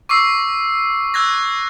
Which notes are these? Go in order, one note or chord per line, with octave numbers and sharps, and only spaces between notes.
C#6 D6 E6 C7
E6 F#6 G#6 A#6